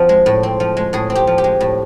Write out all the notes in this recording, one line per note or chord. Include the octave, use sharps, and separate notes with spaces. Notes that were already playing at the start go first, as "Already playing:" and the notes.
Already playing: F3 C4 F#4
G#3
A2
C4
F3
G#3
A2 G#4
C4
G4
F3
G4
G#3
A2